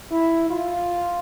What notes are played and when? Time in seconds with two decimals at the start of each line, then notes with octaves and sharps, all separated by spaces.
0.11 E4
0.50 F4